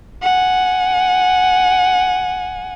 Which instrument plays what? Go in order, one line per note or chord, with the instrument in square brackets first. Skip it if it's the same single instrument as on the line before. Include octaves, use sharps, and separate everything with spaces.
[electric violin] F#5 G#5